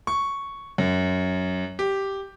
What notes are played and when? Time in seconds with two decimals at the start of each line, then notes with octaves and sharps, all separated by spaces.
0.07 C#6
0.78 F#2
1.79 G4